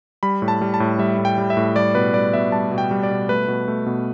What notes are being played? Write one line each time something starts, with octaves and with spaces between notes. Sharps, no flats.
G3 B5
A2
A5
G3
A5
A2
G3 E5
A2
G5
G3
E5
A2
G3 D5
B2 B4
G3 D5
B2 E5
G3 A5
B2
G5
G3
D5
B2
A3 B4
B2
A3
B2